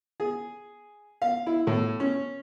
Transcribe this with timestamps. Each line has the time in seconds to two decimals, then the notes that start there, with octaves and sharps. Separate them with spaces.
0.20 G#4
1.22 F5
1.46 E4
1.67 A2
2.00 C#4